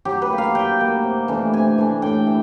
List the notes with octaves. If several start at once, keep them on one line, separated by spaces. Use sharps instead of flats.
F#3 G4
B4
A#3 D#4
F5
F#3 G5
A#3 D#4
C3
E3 A3 D4
C3 G#5
E3 A3 D4
A2 G5
E3